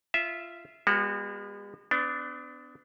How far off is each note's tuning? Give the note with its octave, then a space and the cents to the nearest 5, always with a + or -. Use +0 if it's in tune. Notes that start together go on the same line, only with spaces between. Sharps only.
F4 -20 E5 -5
G#3 -45 B3 -15 F#4 +0
B3 +40 D4 +0